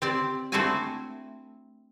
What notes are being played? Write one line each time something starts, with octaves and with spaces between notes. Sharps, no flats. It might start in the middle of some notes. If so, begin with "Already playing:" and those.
C4 G4 D5
A3 C4 D4 E4 F#4 G#5